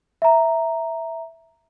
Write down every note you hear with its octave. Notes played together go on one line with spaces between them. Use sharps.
E5 A#5